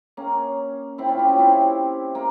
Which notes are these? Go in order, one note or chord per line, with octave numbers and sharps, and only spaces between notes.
A#3 C#4
C4 E4
C#4 F4
E4 G4
C#4 F4
C4 E4
A#3